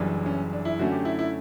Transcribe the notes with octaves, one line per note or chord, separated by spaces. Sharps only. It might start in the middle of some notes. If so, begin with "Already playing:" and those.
Already playing: F#1 F#2 E3 G3 D4
C#4
D4
E4
F#2 D3 A3 C#4 F#4
G4
E4
E4